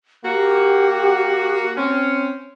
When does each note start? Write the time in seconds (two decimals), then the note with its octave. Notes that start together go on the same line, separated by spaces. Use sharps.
0.25 A#3 F#4 G4
1.76 C4 C#4